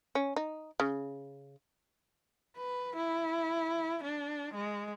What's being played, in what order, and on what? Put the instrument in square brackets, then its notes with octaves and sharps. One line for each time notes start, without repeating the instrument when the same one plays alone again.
[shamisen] C#4
D#4
C#3
[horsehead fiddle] B4
E4
D4
G#3